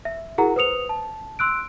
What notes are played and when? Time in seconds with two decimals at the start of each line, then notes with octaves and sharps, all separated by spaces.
0.05 E5
0.38 E4 F#4 G#4 A#4 F#5 A#5
0.56 B4 C5 D#6 C#7 F7
0.89 A5
1.39 C6 E6 F#6 D7